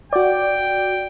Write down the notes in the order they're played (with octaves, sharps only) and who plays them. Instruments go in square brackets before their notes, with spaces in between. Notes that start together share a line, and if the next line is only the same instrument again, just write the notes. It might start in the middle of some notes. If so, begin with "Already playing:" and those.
[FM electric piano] F#4 D5 [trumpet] G5